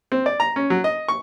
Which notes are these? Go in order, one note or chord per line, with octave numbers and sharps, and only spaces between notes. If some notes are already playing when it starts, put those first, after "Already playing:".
C4
D5
A#5
C#4
F#3
D#5
C#6